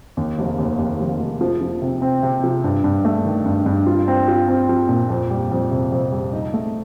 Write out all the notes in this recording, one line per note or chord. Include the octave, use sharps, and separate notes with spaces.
D#2
F1
D#2
D#2
F1
F1
F3
F3
C3
C4
C3
F3
G2
G2
A3
D#3
G2
G2
F4
C4
F4
C4
F3
A#2
F2
G3
F2
C3
F2
G3
D#4
A3